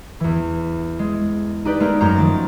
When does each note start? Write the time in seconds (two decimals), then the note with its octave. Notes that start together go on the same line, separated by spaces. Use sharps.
0.20 E2 E3
0.99 G#3
1.65 D#4 G4 B4 D5
1.80 G#3 A3 B3 D#4 A#4
2.01 F#2 C#4 A#4 A#5 C6 G6
2.16 D#3 F3 A6